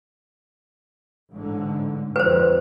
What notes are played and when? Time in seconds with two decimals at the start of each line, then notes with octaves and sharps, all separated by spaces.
1.32 A1 G#2 D3
2.16 F2 B4 C5